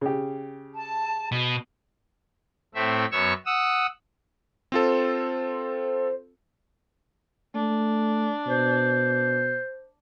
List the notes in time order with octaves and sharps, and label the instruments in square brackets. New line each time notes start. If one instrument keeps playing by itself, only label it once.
[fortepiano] C#3 G4
[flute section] A5
[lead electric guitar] B2
[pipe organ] A2 A3 C4 E5
F#2 B3 C#5 C#6 E6
F#5 D#6 E6
[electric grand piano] C4 F4 A4 [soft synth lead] C5
[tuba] A3 [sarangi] D4
[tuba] B2 [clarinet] C5